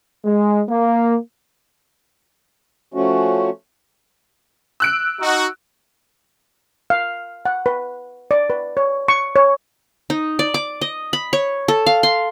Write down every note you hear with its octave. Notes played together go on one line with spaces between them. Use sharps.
G#3
A#3
F3 A3 C#4 F#4
E6 F#6 D7
D#4 F#4
F5
F#5
B4
D5
B4
C#5
C#6
C#5
D#4
D5
D6
D#5
B5
C#5
A4
F5
C6